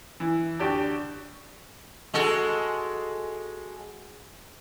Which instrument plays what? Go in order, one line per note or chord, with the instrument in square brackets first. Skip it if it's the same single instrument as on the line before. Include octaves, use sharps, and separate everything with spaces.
[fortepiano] E3
D2 G4 D5 A5
[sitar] G#3 F#4 A4